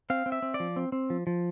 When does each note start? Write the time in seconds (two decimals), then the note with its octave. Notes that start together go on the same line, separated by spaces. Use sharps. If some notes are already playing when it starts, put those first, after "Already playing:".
0.10 C4 F5
0.26 C4
0.32 E5
0.42 C4
0.54 D5
0.60 F3
0.76 C4
0.92 C4
1.10 F3
1.27 F3